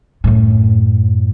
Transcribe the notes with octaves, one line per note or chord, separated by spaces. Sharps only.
F#2 A2